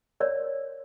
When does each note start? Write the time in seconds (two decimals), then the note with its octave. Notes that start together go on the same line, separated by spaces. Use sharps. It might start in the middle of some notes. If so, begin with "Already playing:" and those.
0.20 A#4 C#5 D5